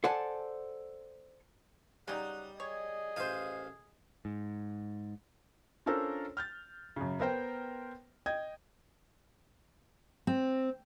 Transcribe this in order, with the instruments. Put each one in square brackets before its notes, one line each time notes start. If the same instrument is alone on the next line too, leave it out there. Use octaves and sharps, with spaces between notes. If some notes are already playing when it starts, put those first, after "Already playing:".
[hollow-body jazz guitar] A4 C5 D5 F#5 G#5 A5
[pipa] C#3 F#3 D#4 [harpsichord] G3 [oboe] F#5
[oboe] G#4 [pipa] C#5 [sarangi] D#5
[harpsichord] A1 F5 G#5 [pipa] F3 C5
[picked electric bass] G#2
[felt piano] C#4 D4 F4 A4 A#4 C5
F6 G6 A6
F#2 C#3
B3 A#4 C5 G5
D#5 G5 G#6
[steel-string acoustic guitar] C4